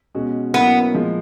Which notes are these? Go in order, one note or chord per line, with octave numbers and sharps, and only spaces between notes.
B2 G#3 C#4 F#4
B2 F#3 A#3 B3 C#4 E4
A#2 F3 G#3